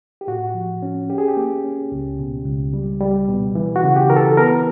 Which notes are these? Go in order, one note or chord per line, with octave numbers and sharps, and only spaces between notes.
G4
A2 F#4
F3
C#4
C#4 G4
G#4
G4
A#3
C#4
C#2
B2
C#2
G3
G3
B2
E3
F#4
C#3
G4
E3 A#4
A4
B3 A#4